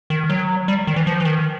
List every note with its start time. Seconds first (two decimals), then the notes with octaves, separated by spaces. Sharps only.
0.10 D#3
0.29 F#3
0.68 G3
0.87 D#3
0.96 E3
1.07 F3
1.20 E3
1.25 D#3